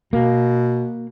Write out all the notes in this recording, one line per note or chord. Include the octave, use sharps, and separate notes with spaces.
B2 A#3